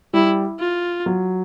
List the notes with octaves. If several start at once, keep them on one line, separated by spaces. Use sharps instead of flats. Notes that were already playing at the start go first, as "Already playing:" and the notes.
G3 E4
F4
F#3